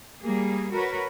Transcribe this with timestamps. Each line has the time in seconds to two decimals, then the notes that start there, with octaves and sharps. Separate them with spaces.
0.22 G3 A#3 G#4
0.72 F#4 A#4 B4 C#5